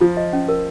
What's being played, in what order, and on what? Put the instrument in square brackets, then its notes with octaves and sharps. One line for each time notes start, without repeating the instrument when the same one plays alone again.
[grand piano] F3 [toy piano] F4
[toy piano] D#5
C#4
A#4